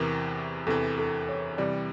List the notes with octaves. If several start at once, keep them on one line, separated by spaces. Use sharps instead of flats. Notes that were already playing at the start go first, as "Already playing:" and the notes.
Already playing: E2 C3 E3 A#4
E2 C3 E3 A4
A4
C#5
C3 E3 G3 D5